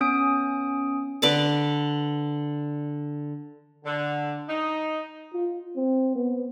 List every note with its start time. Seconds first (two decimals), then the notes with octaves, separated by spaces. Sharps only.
0.01 B3 C#4 D#6 D7
1.22 D3 B4 D5 D6
3.85 D3
4.49 D#4
5.34 F4
5.76 C4
6.15 B3